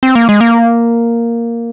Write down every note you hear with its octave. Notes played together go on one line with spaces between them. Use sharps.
C4
A#3
G#3
A#3